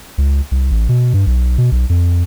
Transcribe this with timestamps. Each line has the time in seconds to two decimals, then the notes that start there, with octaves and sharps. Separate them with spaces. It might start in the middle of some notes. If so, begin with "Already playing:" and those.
0.18 C#2
0.51 C2
0.71 A1
0.89 B2
1.14 G2
1.27 B1
1.58 B2
1.72 B1
1.89 F2